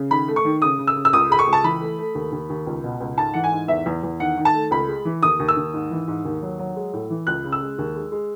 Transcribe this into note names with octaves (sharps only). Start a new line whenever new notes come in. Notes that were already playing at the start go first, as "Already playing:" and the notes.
Already playing: C#3
D#3 B5
A3
C#6
D#3
C#3 D#6
C#3
E6
C#3
E6
C#2 D#6
G#3 B5
C#6
C#2
A5
E3 B5
A3
A3
D#2
D#2
D#2
C#2
B2
C#2
G#2 A5
E3 F#5
G#5
G#2
E2 E5
E2
E2
D#3 F#5
D#3
A5
A3
C#2 B5
G#3
E3
D#2 D#6
D#2
E6
D#2
G#2
E3
G#2
D#2
F#3
F#3
G#3
A2
E3
C#2 F#6
C#3
E6
G#3
D#2
G#3
G#3